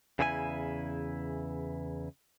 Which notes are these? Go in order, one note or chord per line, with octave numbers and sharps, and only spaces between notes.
E2 C#3 E4 B4 G#5